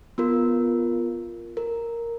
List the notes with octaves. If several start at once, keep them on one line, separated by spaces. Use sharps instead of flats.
B3 F4 A#4
A#4